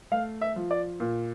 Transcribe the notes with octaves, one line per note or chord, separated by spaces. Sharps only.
A3 F5
E5
F3
D5
A#2